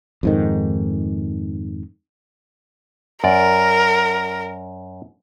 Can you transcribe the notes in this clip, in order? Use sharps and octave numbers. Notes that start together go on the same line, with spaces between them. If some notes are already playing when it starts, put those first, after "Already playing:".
F2 G#2 D#3
F#2 A#4 D5